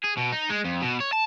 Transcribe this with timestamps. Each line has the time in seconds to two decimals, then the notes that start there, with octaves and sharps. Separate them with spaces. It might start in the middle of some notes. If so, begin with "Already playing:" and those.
0.04 G#4
0.17 B2
0.32 D#4
0.50 G#3
0.65 F2
0.82 B2
1.00 C#5
1.13 A5